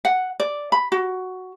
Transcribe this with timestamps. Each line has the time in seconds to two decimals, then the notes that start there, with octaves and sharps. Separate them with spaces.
0.05 F#5
0.40 D5
0.72 B5
0.92 F#4